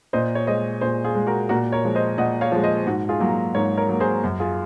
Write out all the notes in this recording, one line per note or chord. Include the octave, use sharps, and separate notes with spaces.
A#2 C5 D#5
C#5
G#3 C5 D#5
A#2 G#4 C5
F4 G#4
G#3
F#4 A#4
A#2 F#4 A#4
A#4 C#5
F3 G#3
C5 D#5
A#2 D#5 F#5
C#5 F5
F3 G#3
C5 D#5
G#2 F#4
F4 G#4
F#3 A#3
F#4
G#2 A#4 C#5
A#4 C#5
F#3 A#3
G#4 C5
F#2
F4 G#4